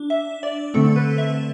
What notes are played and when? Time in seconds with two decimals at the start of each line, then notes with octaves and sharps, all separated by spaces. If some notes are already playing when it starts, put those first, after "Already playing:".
Already playing: D4
0.10 E5
0.43 D5
0.74 D3 A3 C4 A4
0.96 B4
1.18 E5